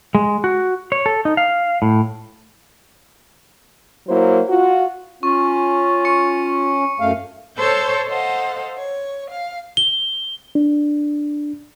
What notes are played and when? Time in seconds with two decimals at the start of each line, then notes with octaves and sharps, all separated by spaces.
0.15 G#3
0.44 F#4
0.92 C#5
1.06 A4
1.25 D#4
1.37 F5
1.82 A2
4.08 F#3 A#3 E4 C5
4.49 F4 F#4
5.23 C#4 F4 C#6
6.05 C#6 C#7
7.00 F#2 A3 F5
7.58 A4 C5 C#5 A5 E6 G6
8.05 A4 C5 D#5 F5 F#5
8.77 C#5
9.30 F5
9.77 G7
10.55 D4